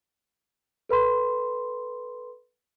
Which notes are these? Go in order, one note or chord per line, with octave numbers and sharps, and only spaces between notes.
A4 B4 B5 C6